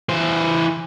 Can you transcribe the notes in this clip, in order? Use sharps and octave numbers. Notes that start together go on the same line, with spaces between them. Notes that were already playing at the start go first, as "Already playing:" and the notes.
E3 C5